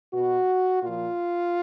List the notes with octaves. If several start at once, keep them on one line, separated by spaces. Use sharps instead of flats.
B2 F#4
A#2 F3 F4